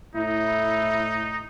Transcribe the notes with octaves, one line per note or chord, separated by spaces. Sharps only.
A2 D#4 E4